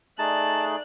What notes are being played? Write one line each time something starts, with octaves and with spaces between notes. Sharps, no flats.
A3 D#4 G#4 D5 A5 F#6